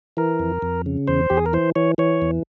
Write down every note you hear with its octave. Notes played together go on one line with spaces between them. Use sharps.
E3 A#4
F2
F2
C#3
E2 C5
E2 G4
G#4
A#4
E3 C5
E3 C#5
E3 C#5
E2